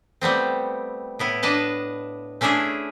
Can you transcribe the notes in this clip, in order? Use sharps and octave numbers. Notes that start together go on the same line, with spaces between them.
G3 A3 B3 C4
A2 B3 E4
D4 B4 D#5 A5
A3 C#4 D4 E4 G#4